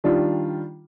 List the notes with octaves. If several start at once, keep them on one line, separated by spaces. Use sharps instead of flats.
D#3 G3 D4 F4